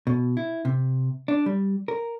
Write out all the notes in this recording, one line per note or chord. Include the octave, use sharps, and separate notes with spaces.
B2
E4
C3
D4
G3
A#4